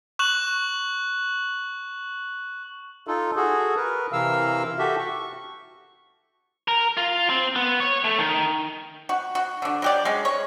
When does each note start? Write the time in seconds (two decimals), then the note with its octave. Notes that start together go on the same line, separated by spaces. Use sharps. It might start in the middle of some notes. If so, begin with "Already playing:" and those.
0.19 C#6 F#6 E7 F#7
3.07 D#4 F4 A4
3.36 F#4 G#4 A4
3.76 A#4 B4
4.13 C3 E3 A#4 F5 E6
4.79 F#4 G4 A4 E5
4.99 C#6
6.68 A#4
6.97 F4
7.30 C4
7.56 B3
7.80 C#5
8.04 A3
8.18 D#3
9.09 F#4
9.35 F#4
9.62 D3 D4
9.82 F#3 G4 D5
10.05 G#3 C#4
10.25 C#5